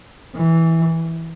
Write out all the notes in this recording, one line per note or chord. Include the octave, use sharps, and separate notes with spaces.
E3